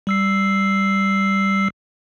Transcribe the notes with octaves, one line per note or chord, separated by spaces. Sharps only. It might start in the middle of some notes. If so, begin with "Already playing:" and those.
G3 E6 C7